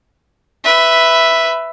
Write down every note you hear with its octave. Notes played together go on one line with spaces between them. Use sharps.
B4 E5